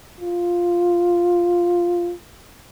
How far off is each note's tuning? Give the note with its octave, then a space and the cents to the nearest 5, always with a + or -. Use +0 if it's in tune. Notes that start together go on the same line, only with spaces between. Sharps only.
F4 +0